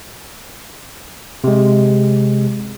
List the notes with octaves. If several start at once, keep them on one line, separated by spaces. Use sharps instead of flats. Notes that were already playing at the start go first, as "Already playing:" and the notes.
C3 G#3